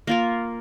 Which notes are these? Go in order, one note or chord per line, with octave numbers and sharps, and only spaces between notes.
A#3 F4 A#4